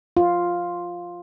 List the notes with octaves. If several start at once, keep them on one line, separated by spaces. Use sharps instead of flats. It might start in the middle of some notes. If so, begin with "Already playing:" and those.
F4